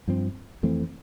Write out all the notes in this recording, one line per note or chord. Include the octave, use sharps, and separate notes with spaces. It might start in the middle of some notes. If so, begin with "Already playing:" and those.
G2 F3 C4
F2 E3 A3 C4